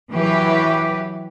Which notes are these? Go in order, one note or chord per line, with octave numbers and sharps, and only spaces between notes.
E3 F#3 G4 B4